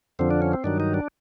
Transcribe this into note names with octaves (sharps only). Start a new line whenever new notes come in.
F2 D3 F3 C4
D4
C#4
C4
G2 D#3 F#3 D4
D#4
D4